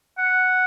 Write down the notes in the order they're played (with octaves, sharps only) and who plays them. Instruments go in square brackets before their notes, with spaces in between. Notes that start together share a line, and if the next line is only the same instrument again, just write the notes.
[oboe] F#5